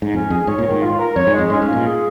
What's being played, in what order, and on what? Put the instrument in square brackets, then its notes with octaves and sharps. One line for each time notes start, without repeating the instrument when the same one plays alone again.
[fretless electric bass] G#2
[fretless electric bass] F2 [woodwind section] C#4
[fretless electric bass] F2 [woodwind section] G#4
[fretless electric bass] G#2 [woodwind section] C#5
[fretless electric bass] A#2
[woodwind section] D#3
[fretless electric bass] G#2
[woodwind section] F4
A#4
[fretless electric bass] F2 [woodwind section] C#5
[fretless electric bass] G#2
[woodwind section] G#3
[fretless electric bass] F2
[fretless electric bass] G#2 [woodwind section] C#4
[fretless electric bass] G#2
[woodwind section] F4
[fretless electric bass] A#2
[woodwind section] G#4